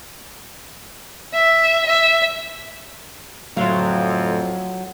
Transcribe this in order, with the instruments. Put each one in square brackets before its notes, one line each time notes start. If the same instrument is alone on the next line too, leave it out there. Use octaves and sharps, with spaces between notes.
[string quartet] E5
E5
[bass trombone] F2 [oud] A2 D3 E5 [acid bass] F#3 [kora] F4 F5